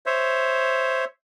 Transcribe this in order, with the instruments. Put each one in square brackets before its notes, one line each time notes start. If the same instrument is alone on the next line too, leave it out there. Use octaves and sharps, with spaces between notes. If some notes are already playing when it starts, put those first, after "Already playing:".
[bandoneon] C5 C#5 E5